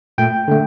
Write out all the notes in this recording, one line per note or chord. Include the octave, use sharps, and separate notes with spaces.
A#2 A3 G5
D3 A3